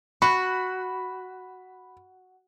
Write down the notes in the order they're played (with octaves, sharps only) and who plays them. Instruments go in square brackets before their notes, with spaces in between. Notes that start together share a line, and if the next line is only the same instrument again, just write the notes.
[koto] F#4 [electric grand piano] B5